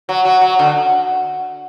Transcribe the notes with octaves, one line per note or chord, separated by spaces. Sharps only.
F#3
F#3
F#3
D3